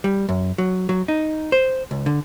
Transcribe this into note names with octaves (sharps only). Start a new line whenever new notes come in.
G3
F#2
F#3
F#3
D#4
C5
C#2
D3